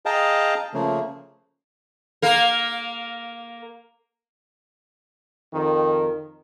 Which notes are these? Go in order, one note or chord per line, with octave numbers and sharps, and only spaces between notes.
G#4 D#5 F5 G5 A5 A#5
C#3 F3 A3 A#3
A#3 A#4
F2 D#3